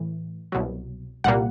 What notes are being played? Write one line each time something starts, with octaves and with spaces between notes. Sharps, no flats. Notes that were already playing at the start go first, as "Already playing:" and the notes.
Already playing: A2 E3
C2 B2 F#3
C2 A#2 G3 A#3 F#5